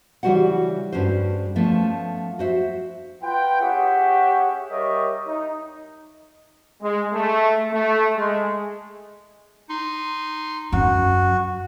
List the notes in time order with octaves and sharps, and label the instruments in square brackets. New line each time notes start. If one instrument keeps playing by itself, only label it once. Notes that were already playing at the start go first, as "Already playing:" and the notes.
[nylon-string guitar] C#3 E3 G3 F#4 C5 F#5
G2 G#3 C#4 F#4 C5
F3 A3 B3 C#4
F#4 C5 E5
[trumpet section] F4 B4 F#5 G5
C#4 G4 G#4 E5 F#5
G3 A#4 C#5 D#5 E5
D#4
[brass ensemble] G#3
A3
A3
G#3
[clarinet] D#4 [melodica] C6
[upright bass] F#2 [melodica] F#4